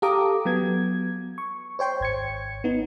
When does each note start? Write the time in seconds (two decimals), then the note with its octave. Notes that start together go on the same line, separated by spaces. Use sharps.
0.02 G4 A4 F5 A#5 D6 D#6
0.45 F#3 B3 G#6
1.38 C#6
1.79 C5 C#5 G5 C6
2.00 G#1 G#6 C#7
2.64 B3 D#4